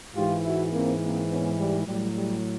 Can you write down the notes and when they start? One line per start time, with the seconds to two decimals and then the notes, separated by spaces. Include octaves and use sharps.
0.15 G#2 E3 F4 G4
0.43 E4 F#4
0.72 A#3 C4
1.01 A#3 C4
1.30 B3 C#4
1.57 G3
1.86 A2 F#3 G3
2.15 G3